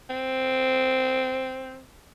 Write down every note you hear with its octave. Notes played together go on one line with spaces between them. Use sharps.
C4